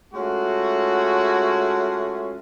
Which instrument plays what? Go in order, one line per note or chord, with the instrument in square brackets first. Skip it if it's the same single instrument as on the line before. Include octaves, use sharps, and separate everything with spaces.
[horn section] G#3 A3 C#4 F4 F#4